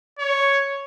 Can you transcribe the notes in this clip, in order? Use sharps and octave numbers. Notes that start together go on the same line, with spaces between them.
C#5